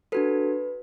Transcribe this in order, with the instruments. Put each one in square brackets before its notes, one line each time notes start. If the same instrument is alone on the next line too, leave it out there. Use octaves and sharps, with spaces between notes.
[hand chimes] D4 F#4 A4 B4